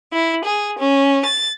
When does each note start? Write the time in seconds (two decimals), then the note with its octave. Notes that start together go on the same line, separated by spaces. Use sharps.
0.12 E4
0.43 G#4
0.78 C#4
1.25 A6